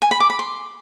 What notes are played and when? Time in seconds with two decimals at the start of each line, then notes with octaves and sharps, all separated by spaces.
0.02 G#5
0.11 B5
0.20 D6
0.30 B5
0.39 C6